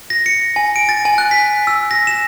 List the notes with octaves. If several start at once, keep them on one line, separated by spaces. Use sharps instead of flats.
A#6
C#7
G#5
D7
A6
G#5
F#6
B6
E6
A#6
E7